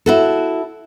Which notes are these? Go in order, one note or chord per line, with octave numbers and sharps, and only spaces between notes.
E4 F#4 A4